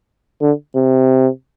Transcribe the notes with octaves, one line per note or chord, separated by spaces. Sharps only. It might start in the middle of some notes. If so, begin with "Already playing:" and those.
D3
C3